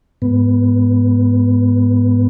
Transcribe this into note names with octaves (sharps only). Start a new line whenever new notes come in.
G#2 B3